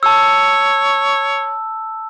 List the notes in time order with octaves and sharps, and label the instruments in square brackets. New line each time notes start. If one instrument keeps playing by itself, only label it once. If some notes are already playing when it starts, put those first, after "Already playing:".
[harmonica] C#5 [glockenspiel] A5 E6